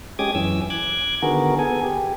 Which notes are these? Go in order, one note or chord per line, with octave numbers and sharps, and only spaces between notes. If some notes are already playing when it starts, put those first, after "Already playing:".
G#3 C#4 G4 D6 D#6 G#6
F#2 E3 C#4 E6
D6 F#6 G#6
D3 D#3 B3 F#4 G#4 A#4
B3 G#4 A4 G#5
G4